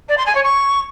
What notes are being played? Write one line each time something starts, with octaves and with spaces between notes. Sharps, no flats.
D5
C6
G#5
C#5
C#6